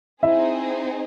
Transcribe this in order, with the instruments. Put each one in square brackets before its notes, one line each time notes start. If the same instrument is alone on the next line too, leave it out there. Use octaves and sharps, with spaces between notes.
[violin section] C4 D#4 G#4 [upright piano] E4 E5